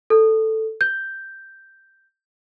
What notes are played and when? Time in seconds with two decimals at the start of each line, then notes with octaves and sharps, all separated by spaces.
0.10 A4
0.81 G6